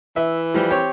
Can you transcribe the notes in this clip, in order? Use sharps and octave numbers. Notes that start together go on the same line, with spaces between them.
E3 E5
F3 G3
C4 G4 C#5